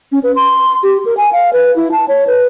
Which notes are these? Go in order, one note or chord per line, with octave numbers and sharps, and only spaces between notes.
C#4
B4
C6
G4
A#4
G#5
F5
B4
E4
A5
C#5
B4